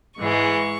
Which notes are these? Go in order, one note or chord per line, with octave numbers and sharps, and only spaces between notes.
G#2 E3 G#3 C#6